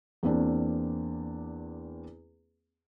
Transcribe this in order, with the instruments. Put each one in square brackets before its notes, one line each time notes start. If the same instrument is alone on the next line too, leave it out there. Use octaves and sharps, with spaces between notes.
[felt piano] E2 A#3 C4 D4